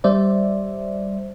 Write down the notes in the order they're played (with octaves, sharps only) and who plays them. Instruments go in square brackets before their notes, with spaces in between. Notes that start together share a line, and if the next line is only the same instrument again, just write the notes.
[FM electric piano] G3 C5 D5 E5